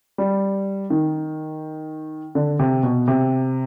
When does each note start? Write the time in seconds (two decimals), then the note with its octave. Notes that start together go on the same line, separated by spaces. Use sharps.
0.18 G3
0.90 D#3
2.35 D3
2.59 C3
2.83 B2
3.08 C3